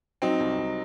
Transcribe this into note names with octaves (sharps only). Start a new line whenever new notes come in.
F#3 C4 D#4
C2
C2